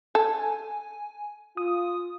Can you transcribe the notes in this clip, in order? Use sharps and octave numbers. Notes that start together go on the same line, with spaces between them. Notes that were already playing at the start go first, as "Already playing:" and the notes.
A4 G#5
F4 D#6